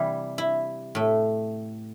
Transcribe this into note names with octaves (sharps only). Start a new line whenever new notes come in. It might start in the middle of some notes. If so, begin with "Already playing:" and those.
Already playing: C3 E3 G3 E4
E4
A2 A3